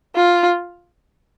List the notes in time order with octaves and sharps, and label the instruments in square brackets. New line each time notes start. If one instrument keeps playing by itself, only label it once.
[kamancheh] F4